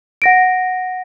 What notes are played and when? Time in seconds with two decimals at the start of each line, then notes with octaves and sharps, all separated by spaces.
0.22 F#5 A#6 D7